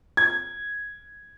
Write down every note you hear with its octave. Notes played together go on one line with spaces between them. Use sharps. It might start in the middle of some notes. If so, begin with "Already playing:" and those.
G#6